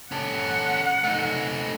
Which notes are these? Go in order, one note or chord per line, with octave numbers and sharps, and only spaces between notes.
C#4 A4 F#5
A3 D#4